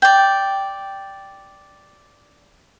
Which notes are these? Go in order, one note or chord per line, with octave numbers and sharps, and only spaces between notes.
D5 G5